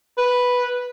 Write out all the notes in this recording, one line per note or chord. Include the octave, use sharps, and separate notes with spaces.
B4